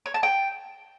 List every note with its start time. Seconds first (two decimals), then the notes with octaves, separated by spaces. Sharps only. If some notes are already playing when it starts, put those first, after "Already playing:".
0.06 C#5
0.14 A5
0.23 G5